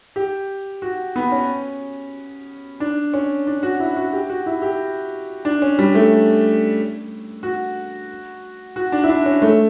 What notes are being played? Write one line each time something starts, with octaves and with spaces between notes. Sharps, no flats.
G4
F#4
B3
C#4
D4
C#4
D4
F#4
E4
F#4
G4
F#4
E4
G4
D4
C#4
G3
A3
F#4
F#4
D4
E4
D4
C#4
A3